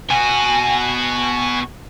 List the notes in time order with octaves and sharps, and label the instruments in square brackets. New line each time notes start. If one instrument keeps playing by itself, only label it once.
[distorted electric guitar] B2 F#4 [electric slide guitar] G#5